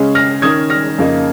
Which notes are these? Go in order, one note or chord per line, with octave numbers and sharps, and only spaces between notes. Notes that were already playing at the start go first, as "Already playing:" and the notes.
Already playing: C#3 G#3 C#4
F6 A#6
D#3 C#4 D#6 G#6
F6 A#6
F2 C#3 A#3 D#4